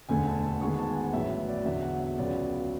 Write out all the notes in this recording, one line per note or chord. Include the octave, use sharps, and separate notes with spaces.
E1 D2 D3 A3 G#5
A5
A5
G#1 G#2 G#3 B3 C#6
A5
G#5
F#5
A1 A2 F#3 B3 E5
E5
D5
E2 D3 F#3 A3 E5
F#5
E5
C#2 C#3 F#3 B3 D5